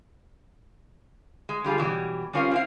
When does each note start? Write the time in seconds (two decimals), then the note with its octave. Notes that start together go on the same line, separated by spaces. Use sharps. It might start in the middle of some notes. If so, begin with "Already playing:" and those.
1.49 G#3
1.64 D3 G3 F4 G#4
1.78 B2 E3 F#3 G3
2.33 G3 C4 C#4 F4 A#4 F5
2.51 C4 E4 F5